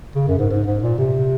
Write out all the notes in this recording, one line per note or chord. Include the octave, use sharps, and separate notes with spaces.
C#3
F#2
G#2
G#2
G#2
A#2
C3